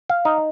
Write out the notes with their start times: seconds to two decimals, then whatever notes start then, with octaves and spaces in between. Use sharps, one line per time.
0.10 F5
0.25 D#4